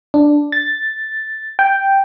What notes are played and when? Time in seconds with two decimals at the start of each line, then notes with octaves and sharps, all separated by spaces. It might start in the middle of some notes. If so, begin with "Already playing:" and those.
0.14 D4
0.52 A6
1.59 G5